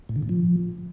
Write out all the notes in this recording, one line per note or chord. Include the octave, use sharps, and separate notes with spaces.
A2
D3
A2
F3